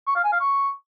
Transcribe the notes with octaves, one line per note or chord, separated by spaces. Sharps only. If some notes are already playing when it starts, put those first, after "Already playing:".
C#6
F5
G#5
F5
C#6